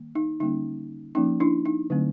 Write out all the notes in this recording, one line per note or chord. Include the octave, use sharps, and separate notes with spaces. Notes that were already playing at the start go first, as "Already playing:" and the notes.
Already playing: D#3 G3 A#3
D#4
D3 G3 A#3 C#4 D#4
F3 A#3 C#4 D#4
D4 E4
D#4
D3 F#3 A3 C4